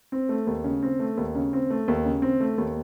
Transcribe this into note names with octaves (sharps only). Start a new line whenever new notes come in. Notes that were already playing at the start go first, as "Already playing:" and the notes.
C4
A3
D#2
C#3
C4
A3
D#2
C#3
C4
A3
D#2
C#3
C4
A3
D#2